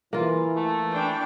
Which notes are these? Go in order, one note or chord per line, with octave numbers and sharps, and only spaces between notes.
E3 A#3 F4
A3
E3 D4 G5